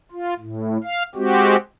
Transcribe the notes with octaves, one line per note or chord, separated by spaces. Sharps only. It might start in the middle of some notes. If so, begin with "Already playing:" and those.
F4
A2
F5
G#3 C4 F#4 G4